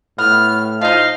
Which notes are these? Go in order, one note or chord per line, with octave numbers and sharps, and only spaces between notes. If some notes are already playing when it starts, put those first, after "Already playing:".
A2 B3 F6
F3 D#4 D#5 F5